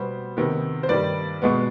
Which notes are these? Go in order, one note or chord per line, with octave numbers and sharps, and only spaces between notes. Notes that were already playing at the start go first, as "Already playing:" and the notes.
Already playing: B2 G3 B3 C5
C3 D#3 B3
C5
G2 D#3 G3 B4 D5
B2 G#3 B3